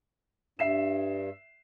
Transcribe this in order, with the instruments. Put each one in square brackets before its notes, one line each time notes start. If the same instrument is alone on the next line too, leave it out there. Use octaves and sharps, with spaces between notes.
[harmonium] G2 [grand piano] E5 C7 E7